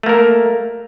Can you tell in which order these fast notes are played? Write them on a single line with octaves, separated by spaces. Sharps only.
A3 A#3 A#4